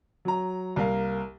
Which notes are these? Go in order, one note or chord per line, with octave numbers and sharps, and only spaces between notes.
F#3 A#5
C2 A#3 A#4 F5